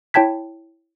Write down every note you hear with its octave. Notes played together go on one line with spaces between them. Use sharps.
E4 C#5 G5 A5 G#6 B6